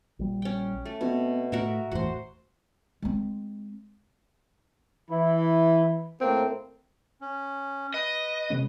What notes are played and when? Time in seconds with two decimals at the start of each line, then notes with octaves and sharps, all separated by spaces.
0.19 A#1 G3
0.42 C#4 G5
0.85 A3
1.01 B2 B3 C4
1.52 A2 F#4 A#4 E5
1.91 G1 E2 A2 F#4 C5
3.02 G#3 C4
5.10 E3 E4
6.21 A2 A#3 C4
7.21 C#4
7.94 B4 D#5
8.50 C3 G#3 C#4